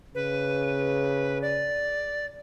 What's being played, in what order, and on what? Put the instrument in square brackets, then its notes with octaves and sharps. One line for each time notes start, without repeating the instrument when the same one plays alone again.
[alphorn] C#3 [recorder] B4
[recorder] D5